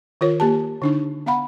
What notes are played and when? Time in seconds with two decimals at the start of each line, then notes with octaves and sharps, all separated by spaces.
0.21 D#3 F4 A#4 C#5
0.40 A#3 G4 A5
0.82 D3 D4 D#4
1.26 B3 F5 F#5 B5